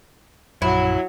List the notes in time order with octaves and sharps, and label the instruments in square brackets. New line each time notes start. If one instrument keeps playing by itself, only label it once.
[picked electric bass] A#1 F#2 [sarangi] F#3 [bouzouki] E4